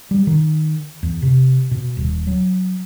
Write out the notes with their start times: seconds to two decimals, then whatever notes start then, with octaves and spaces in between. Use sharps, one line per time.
0.11 G3
0.27 D#3
1.03 E2
1.22 C3
1.71 B2
1.97 D#1
2.27 F#3